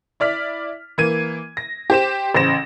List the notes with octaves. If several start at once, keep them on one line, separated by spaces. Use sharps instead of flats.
E4 D5 F6 B6
E3 A#3 G#6 D#7
A#6
G4 C5 E7
A1 C#3 C5 A#6 E7